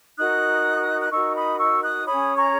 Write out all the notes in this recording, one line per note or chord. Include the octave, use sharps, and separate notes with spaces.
D#4 F#4 A#4 D#6 F#6
F#6
D#4 F#4 A#4 C#6 E6
B5 D#6
C#6 E6
D#6 F#6
C#4 G#4 C#5 B5 D#6
A#5 C#6